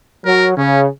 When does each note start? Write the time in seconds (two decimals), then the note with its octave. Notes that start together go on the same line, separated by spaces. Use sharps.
0.25 F#3 A#4
0.57 C#3 C#4